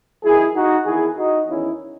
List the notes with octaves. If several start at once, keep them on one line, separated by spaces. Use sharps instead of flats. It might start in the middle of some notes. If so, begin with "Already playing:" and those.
F#2 D#3 E4 G#4
D#4 F#4
E2 D#3 E4 G#4
D#4 F#4
E2 D#3 C#4 E4